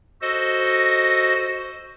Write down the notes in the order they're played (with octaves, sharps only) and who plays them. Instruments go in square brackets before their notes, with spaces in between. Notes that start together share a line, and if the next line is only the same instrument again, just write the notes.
[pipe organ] F#4 A4 C5 D#5